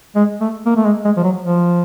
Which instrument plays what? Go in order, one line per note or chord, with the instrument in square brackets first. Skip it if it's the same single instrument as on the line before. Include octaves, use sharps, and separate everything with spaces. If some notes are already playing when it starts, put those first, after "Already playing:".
[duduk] G#3
A3
A#3
A3
G#3
G#3
F3
F#3
F3